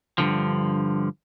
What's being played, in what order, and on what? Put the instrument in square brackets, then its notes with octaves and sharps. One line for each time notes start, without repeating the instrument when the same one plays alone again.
[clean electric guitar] G2 A#2 D3 F3